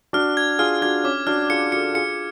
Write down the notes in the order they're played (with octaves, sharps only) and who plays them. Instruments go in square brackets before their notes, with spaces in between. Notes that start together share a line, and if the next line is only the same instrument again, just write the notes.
[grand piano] D4 F#4 [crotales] F6
[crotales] G#6
[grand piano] F4 G#4 [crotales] F6
[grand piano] D4 F#4 [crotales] G#6
[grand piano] C#4 [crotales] D6
[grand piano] D4 F#4 [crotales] F6
[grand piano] F4 G#4 [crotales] C#7
[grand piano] F#4 A4 [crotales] C#7
[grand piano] F4 G#4 [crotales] C#7